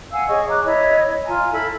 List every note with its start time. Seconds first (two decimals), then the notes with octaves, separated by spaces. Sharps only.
0.12 F5 F#5 G#5 E6
0.29 G#4 C#5 D#5 C#6
0.48 A#5 D6 F#6
0.65 E4 C#5 D#5
1.26 F4 G#5 A#5
1.52 E4 A4 B5